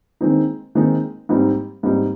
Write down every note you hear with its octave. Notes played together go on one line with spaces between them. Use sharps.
D#3 G#3 C4 D#4
D#3 G#3 C4 D#4
G#2 G3 C4 D#4
G#2 G3 C4 D#4